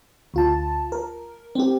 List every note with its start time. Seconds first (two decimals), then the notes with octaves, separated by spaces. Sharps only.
0.34 D2 F4 A5
0.92 A#4
1.55 C4 G4